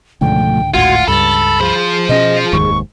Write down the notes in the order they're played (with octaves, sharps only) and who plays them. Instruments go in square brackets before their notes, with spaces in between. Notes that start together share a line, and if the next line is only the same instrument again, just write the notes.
[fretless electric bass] C#2 G#2 D3 [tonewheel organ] B2 F3 A3 [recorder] G5
[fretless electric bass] G#1 D2 A2 [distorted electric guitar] F4 [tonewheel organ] F#4 C6 G#6 [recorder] F#5
[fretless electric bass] C#2 G2 [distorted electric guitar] A4 [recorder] B5 [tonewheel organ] A6
[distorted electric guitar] F3 C5 [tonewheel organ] G#4
[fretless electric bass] B2 C#4 [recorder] D#5
[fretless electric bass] F1 D#2 G#2 [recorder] C#6